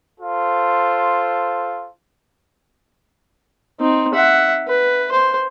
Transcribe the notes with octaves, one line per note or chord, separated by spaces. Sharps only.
F4 A4 C5
C4 D#4
E5 F#5
B4
C5